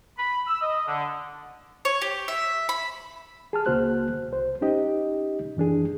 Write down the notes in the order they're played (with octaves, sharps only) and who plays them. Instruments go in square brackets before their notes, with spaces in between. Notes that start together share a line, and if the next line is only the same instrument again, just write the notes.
[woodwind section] B5
E6
D#5
D3
[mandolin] C#5
G4
E5
B5
[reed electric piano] G#4 A5 F6
C#2 C#3 A#3 F#4 C5 F#6
C2 C5
C#4 D#4 G4 D#5
F#2 E3 D4 G#4